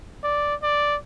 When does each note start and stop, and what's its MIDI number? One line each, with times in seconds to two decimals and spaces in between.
0.24 0.55 74
0.63 0.96 74